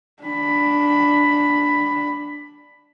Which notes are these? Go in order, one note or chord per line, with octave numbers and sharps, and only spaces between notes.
D4 B5